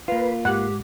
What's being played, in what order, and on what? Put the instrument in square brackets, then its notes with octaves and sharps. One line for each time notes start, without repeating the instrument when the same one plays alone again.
[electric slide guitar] A#3 F4 [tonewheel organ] B4
[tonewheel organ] G#2 [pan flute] G4 [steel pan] F#5